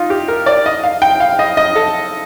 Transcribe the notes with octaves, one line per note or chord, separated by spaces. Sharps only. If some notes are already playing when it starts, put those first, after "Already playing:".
Already playing: D#4 F4
G4
A#4
D5
D#5
F5
G5
F5
D#5
D#5
A4